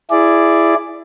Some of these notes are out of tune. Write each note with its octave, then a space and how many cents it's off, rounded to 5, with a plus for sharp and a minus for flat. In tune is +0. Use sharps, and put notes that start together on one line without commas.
E4 +15 G#4 +0 D5 +0